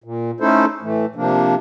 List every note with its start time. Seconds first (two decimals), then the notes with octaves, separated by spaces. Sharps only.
0.04 A#2
0.40 A3 C#4 D#4 E4 A4 C5
0.82 A2 E3 A3
1.15 C3 F3 A#3 D4